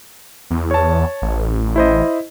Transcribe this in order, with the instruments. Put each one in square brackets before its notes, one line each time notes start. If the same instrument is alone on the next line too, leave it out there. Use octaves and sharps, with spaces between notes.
[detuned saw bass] E2
[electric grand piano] C#5 A5
[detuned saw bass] A1
[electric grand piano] E4 C5 D#5